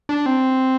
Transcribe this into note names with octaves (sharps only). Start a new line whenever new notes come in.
D4
C4